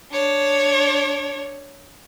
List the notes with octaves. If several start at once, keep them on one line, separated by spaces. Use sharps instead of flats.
D4 C#5